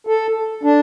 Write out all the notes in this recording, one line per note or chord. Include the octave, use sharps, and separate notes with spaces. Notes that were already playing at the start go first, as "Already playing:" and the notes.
A4
D4